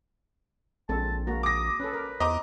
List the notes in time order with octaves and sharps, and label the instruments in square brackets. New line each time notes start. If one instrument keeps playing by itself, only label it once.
[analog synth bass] A#1 [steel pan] G#3 C4 A4 [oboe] A5
[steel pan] G#3 A#3 F#4 [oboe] A#5
[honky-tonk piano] D6 A#6 [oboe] D#6
[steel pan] C#4 A4 [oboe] B4
[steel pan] A#4
[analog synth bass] E2 [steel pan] C5 [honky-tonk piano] D#5 A#5 D6